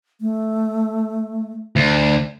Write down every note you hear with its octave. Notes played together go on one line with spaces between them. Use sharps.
A3
D2